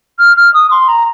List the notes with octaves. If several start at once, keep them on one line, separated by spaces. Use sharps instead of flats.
F6
F6
D#6
C6
A#5